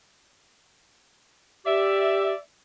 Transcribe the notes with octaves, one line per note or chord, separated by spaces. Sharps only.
G4 D5 E5